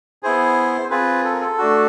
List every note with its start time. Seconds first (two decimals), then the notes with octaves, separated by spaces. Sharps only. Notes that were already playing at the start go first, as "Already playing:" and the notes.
0.23 B3 E4 G#4 C5
0.91 C4 F4 G#4 B4
1.25 A4
1.33 A#4
1.40 A4
1.58 A3 D4 F#4